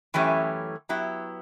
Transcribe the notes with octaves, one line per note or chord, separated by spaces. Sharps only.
F#2 E3 A3 C#4 G4
F#3 B3 E4 G4